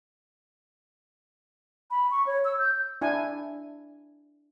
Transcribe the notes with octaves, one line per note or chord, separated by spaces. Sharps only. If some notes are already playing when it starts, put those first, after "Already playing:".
B5
C#6
C#5
E6
G6
D4 E4 G#5